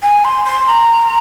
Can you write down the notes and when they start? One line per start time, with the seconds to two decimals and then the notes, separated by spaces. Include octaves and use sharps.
0.02 G#5
0.24 C6
0.45 C6
0.67 A#5